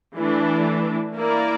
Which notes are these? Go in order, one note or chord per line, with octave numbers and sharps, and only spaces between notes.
E3 A3 D4
A#3 E4 A#4 D5